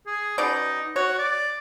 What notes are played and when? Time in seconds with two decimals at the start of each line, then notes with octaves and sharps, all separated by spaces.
0.07 G#4
0.38 B2 C#4 D#4 D5
0.96 F#4 C#5
1.18 D5